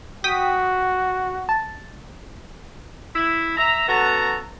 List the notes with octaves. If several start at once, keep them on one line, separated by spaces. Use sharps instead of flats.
F#4 G5 D#6 B6
A5
E4
E5 A#5
B3 C#4 F#4 A4 A#5